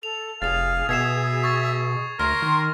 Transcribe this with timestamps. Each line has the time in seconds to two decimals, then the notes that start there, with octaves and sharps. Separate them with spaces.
0.03 A4 F7
0.42 F1 G#4 F5 A6 F7
0.89 B2 E5 G#6 C7 E7
1.44 C#6 G#6 A6
2.19 D2 A#4 C6 F6 A#6
2.42 D#3